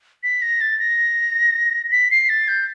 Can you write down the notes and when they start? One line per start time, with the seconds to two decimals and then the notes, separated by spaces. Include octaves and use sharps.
0.23 B6
0.42 A#6
0.61 A6
0.79 A#6
1.92 B6
2.11 C7
2.29 A6
2.48 G6